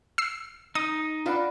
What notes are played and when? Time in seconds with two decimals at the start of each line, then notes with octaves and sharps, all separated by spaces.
0.18 E6 C7
0.75 D#4 D#6
1.26 D4 F4 B4 D5 F5 F#5